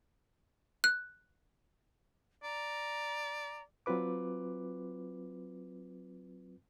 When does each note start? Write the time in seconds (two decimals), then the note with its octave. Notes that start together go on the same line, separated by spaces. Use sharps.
0.84 F#6
2.43 D5 A#5
3.86 F#3 C4 F4 B4 D6